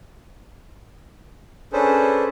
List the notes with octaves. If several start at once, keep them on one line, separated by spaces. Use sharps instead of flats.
C#4 D4 G#4 A4 B4 C5